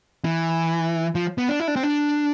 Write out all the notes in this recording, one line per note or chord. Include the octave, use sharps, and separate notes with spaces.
E3
F3
B3
D4
E4
D4
C4
D4